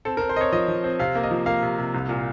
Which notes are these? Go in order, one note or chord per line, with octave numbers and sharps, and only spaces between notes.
C4 A4
A#4
C4
C5
C4 C#5 D#5
F3 D#5
F3
C4
C3 F5
A#3
D#5
F3
A#3 F5
C3
C3
C2
A#2